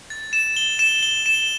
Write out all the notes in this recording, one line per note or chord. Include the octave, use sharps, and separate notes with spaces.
A6
E7
G7
E7
G7
E7